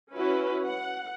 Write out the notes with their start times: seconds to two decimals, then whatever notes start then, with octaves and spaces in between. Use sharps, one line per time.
0.14 C#4 E4 F#4 B4
0.64 F#5